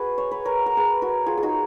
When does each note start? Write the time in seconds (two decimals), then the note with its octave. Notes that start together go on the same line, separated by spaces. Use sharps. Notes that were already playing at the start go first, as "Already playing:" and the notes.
Already playing: F#4 G#4 B4
0.18 C#5
0.31 B4
0.45 A#4 C#5
0.66 A#4
0.77 G#4 B4
1.02 F#4 A#4
1.26 F4 G#4
1.37 G#4
1.43 D#4 F#4